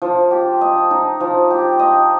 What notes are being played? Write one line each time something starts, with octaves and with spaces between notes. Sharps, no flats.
F3
G4
D#5
D#4
F3
G4
D#5